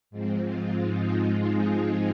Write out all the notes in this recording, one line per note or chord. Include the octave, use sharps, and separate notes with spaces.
G#2 F3 G#3 C4
F4
D#4
F4
G#4